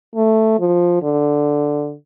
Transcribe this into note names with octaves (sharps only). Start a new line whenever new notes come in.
A3
F3
D3